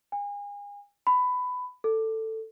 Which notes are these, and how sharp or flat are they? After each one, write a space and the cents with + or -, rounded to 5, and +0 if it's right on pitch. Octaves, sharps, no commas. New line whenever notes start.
G#5 -35
B5 +15
A4 +10